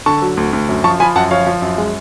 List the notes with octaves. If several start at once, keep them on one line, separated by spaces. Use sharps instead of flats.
D3 A5 C#6
F#3
D2
D2
F#2
F3 A5 C#6
F3 G#5 B5
F#2 F#5 A5
F3 C#5 F5
F3
F#2
G#3